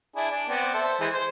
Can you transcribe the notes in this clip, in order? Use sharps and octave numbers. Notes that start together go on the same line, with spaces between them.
D4 E4 G#4
D4
B3 C4 D5
A4 C5 E5
E3 G#3 C5
C5